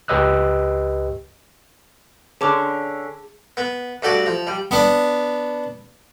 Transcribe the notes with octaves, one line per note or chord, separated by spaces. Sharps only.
C#2 G4 B4 D#5 E6 F#6
D3 C#4 G#4 A5 D6
B3
G2 A3 F#4 D5
F3
G3
B3 D4